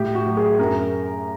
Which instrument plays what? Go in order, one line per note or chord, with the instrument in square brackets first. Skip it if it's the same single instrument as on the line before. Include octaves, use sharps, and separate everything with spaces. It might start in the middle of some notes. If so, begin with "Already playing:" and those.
Already playing: [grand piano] A2 G4
F#4
F#3
G#4
F#2 A#4